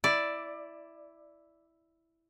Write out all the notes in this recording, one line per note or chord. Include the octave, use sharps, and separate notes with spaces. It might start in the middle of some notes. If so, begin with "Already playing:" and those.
E4 D5